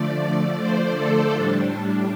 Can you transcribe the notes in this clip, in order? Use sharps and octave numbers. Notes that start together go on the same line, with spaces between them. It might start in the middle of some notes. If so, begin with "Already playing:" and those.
Already playing: D3 F3 A3 D5
C5
A4
A2 G3 D4